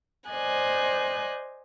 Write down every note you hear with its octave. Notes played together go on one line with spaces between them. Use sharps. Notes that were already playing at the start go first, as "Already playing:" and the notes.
C5 D5 D#5 G#5 F#6